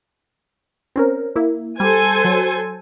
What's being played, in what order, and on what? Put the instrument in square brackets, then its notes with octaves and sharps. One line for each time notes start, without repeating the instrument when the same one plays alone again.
[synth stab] C4 C#4 A#4
A#3 E4
[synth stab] G3 [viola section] A4 C5 G#5
[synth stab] F#3